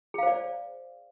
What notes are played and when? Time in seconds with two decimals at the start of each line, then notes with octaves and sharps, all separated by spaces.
0.14 G#4
0.18 F5
0.23 C5
0.27 D5